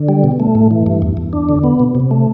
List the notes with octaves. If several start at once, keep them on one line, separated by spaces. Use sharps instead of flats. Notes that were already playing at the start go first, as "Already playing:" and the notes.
Already playing: D3
G3
B2
A3
A2
E3
G2
E2
E2
D4
D3
B3
B2
C3
A3